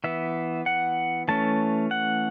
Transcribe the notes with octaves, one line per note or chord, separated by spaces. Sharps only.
E3 B3 E5
F#5
E3 A3 C#4 A5
F#5